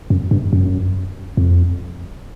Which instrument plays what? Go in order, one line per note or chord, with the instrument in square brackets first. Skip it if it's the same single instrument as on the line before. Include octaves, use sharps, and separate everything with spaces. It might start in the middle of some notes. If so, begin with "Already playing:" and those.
[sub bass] F#2
G2
F#2
F2